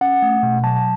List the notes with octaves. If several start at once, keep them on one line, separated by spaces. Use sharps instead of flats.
C#4 F#5
A3
B2
F#3 A5